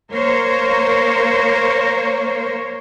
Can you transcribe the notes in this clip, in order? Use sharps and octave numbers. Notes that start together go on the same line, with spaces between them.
A#3 A#4 C5 C#5